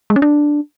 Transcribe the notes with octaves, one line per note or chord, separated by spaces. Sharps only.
G#3
C#4
D4